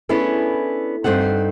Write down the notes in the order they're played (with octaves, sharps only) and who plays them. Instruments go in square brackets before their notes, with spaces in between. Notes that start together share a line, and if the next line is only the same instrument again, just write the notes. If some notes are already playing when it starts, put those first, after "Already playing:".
[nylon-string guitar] B3 C#4 D4 E4 G#4 A4
G2 C4 D#4 A4 F#5